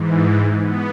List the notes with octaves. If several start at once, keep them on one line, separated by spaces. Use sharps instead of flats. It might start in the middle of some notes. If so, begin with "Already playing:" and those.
Already playing: G#2 E3
B3